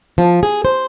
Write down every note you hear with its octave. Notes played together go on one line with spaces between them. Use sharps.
F3
G#4
C5